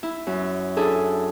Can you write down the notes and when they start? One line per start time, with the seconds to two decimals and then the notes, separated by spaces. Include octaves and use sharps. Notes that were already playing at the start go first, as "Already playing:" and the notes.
0.03 E4
0.27 F#2
0.77 D4 E4 G#4 A4